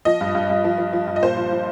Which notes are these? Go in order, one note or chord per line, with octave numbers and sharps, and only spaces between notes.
F3 D#5
G2
G2
G2
F3
F3
F3
G2
D#5
A#2 C5
F3
F3